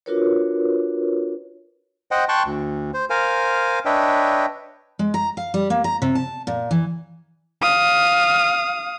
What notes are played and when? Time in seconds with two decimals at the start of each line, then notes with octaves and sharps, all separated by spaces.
0.06 D4 F4 F#4 A#4 B4 C#5
2.11 C5 D#5 F#5 G5
2.29 G5 A5 C6 C#6 F#6
2.46 D2
2.94 C5
3.10 A#4 C5 F5 G#5
3.85 D4 B4 C#5 D#5 E5 G5
4.99 G#3
5.14 A#5
5.37 F5
5.54 G3
5.70 A#3
5.84 A#5
6.02 C3
6.15 A5
6.47 A#2
6.71 E3
7.62 F5 D#6